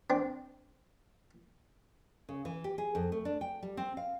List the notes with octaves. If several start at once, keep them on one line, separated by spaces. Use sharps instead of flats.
C4 D4
C#3
E3
G4
G#4
F2
A3
D4
G5
G3
C4
F5